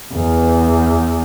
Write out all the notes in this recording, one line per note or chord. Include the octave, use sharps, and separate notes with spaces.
E2